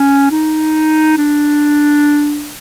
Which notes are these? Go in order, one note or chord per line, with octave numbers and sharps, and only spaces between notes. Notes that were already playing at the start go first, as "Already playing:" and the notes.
Already playing: C#4
D#4
D4